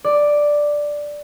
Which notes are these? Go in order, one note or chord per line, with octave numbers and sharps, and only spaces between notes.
D5